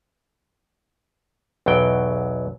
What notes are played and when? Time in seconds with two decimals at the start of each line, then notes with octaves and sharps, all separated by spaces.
1.66 B1 E2 B2 F#3 G5